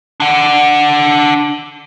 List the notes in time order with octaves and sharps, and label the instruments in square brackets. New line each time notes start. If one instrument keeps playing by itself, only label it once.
[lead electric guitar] D4 F#5